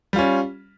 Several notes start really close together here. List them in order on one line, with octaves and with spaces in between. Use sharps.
G3 F4 C#4